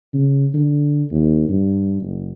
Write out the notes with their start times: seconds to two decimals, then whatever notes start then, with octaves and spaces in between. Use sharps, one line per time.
0.14 C#3
0.54 D3
1.11 D#2
1.49 G2
2.02 F#1